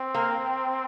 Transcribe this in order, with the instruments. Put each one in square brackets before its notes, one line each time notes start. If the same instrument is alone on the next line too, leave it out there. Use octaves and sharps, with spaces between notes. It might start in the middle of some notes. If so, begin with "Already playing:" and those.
Already playing: [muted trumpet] C4
[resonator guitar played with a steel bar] A#3